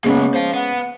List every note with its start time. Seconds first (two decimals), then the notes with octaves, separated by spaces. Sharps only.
0.04 C#3 G#3 A#3 B3 C#4
0.34 C5 F5
0.54 B3 F#5